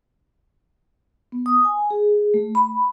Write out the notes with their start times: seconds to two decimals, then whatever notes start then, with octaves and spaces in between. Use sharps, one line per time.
1.32 B3
1.46 D#6
1.65 G#5
1.90 G#4
2.34 A3
2.55 B5